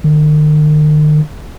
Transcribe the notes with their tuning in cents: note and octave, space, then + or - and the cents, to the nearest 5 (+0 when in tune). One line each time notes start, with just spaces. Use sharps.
D#3 -45